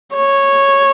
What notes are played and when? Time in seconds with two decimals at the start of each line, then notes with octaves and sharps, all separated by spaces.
0.15 C#5